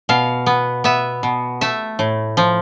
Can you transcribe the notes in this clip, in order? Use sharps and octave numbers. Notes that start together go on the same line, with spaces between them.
B2 F5
B3
B3 E5
B2
A3 E5
A2
F3